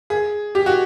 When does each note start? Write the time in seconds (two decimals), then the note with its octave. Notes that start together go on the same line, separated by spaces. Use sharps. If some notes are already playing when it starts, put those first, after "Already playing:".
0.10 G#4
0.55 G4
0.66 F#4